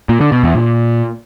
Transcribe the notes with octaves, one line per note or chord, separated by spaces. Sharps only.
A#2
D3
B2
E2
A#2